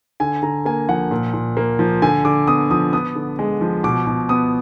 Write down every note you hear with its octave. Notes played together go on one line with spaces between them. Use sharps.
D3 G#5
D3 A#5
A#3 G#5
F3 F#5
A#2
A#2
A#3
F3
D3 G#5
D3 D6
B3 D#6
F3 D#6
B3 D#6
D3
G#3
F3
B2 D6
B2
B3 D#6